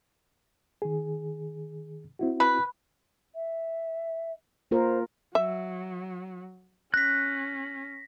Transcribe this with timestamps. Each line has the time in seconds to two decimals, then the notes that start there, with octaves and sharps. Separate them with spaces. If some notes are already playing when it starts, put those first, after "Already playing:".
0.82 D#3 G#4
2.19 C4 E4 F#4
2.40 B4
3.35 E5
4.71 A#3 F4 A#4 C5
5.35 F#3 E5
6.94 C#4 F#6 A#6 B6